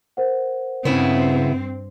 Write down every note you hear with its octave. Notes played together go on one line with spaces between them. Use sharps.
A#4 C5 F#5
G2 C#3 B3 C4 E4